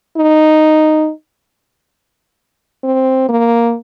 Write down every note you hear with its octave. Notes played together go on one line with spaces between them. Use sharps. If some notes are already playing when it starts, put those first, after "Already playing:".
D#4
C4
A#3